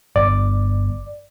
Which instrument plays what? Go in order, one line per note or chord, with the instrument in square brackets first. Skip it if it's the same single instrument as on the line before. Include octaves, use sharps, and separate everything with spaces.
[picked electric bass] G1 [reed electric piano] D5